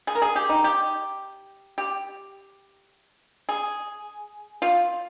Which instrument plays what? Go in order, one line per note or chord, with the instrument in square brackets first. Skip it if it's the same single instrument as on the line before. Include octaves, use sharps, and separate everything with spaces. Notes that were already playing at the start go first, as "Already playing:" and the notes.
[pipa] G#4
A#4
G#4
G4
D#4
G4
G4
G#4
F4